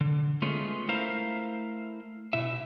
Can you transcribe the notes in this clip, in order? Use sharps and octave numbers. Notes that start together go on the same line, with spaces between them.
D3
G#3 A3 B3 C#4 F4 G#4
A3 E4 A#4 C5 F5 A#5
B2 E4 E5